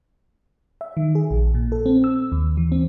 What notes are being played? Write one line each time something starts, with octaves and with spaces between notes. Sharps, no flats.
E5
D#3
G#4
A#1
A#2
A4
C4
E6
D#2
E3
C4